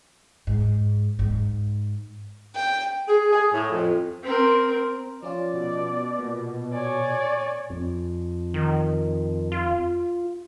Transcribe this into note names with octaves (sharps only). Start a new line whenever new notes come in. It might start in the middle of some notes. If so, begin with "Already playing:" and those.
G#2
G#2
G5
G#4
G#4
A2
F2
C4 A#4
F3 C#4 F4 D5
B2
A#2
C#5 D5 G#5
F2
D#3
F4